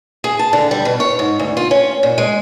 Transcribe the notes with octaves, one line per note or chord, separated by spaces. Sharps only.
G#4
A5
D3
G3
B2
C#5
G#2
D2
F4
C#4
A#2
G#3